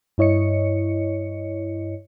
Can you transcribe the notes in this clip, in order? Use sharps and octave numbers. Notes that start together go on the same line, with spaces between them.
G2 E4 C#5 D#5 C#7